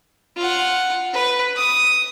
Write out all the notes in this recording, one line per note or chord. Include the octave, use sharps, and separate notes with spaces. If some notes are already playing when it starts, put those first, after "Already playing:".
F4 F#5
B4
D#6